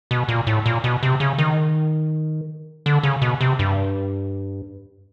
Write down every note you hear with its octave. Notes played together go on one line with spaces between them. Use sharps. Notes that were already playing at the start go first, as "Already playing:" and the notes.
B2
A#2
A2
A#2
B2
C3
C#3
D#3
D3
C#3
B2
C3
G2